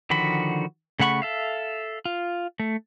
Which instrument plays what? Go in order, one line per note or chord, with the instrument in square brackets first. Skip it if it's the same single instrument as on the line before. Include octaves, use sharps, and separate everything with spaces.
[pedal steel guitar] D3 D#3 F3 F#4 B5
C#3 A3 F#5 B5 C#6
A4 E5 F5
F4
A3